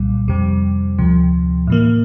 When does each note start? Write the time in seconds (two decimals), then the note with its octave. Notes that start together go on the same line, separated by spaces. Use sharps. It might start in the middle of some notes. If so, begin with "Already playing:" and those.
Already playing: C2 A#2 G3
0.28 F2 C3 G3
0.98 D2 C3 F3
1.67 A2 E3 A#3